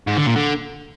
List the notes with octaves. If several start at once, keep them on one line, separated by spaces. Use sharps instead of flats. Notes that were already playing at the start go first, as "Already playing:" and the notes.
G#2
D3
A#2
D3